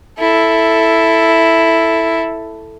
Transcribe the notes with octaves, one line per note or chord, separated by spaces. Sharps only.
E4 A4